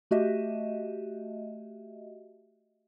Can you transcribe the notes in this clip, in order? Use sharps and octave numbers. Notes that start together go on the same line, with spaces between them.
A3 F#4 G4 D#5 E5